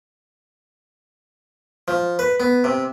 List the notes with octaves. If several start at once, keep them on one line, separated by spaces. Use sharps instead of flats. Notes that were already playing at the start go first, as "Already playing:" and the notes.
F3
B4
B3
C3